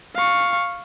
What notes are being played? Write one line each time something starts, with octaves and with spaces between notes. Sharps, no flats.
F5 C#6